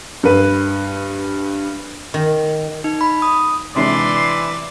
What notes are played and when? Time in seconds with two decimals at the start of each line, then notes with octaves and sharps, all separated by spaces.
0.23 G2 B4
2.14 D#3
2.84 D#4
3.01 B5
3.22 D#6
3.76 C3 E3 G#3 D4 D5 C6